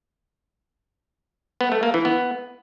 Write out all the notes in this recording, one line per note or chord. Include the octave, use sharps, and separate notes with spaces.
B3
A3
A#3
E3
B3